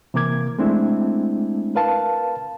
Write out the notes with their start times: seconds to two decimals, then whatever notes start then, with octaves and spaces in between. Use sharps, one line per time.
0.14 C3 E3 A#3 A#4 D6 G#6
0.59 G#3 A3 C4 D4 E4
1.75 A#4 B4 F5 A5